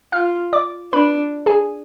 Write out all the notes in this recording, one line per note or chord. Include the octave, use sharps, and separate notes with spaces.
F4 F5 F6
D5 D6
D4 B4 B5
G#4 G#5